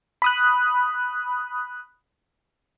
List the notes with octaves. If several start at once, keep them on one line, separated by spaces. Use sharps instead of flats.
B5 D#6 F#6